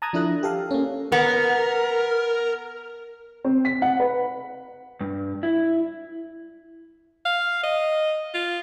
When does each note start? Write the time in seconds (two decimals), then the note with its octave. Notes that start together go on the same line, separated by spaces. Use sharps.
0.02 A5 A#5 D#6 F#6 G#6
0.13 F3 D4 E4 A4 F#6 A#6
0.43 G4 A4 F5
0.71 A#3 C#4
1.12 B3 A#4
3.44 C4
3.65 B6
3.82 F#5
4.00 B4
5.01 G2
5.43 E4
7.26 F5
7.63 D#5
8.34 F4